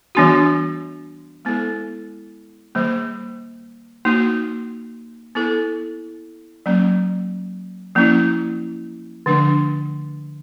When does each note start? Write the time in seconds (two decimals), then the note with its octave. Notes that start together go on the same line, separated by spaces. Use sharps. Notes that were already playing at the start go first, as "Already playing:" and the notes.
0.15 E3 G3 B3 D4 F#4
1.45 G#3 B3 E4 A4
2.75 D#3 G3 A#3
4.05 A#3 D#4 F#4
5.35 B3 E4 A4
6.66 F#3 A#3 C#4
7.95 F3 A#3 C#4 E4
9.26 D3 F3 A3 D4